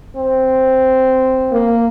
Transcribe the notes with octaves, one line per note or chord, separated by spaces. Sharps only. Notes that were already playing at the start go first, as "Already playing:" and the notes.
C4
A#3